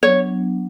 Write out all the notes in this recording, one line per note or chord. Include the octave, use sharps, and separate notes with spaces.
F#3 B3 D4 C#5